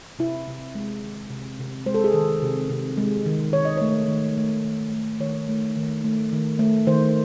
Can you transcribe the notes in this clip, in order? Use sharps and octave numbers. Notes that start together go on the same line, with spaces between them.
C3 E4
C3
G#3
D#3
C3
C3
G#3 C5
A4
G#4
D#3 A4
C3
C3
G#3
D#3
D#3 C#5
D#5
A3 C#5
D#3
A3
D#3
A3
D#3 C#5
A3
D#3
A3
D#3
A3
D#3 C5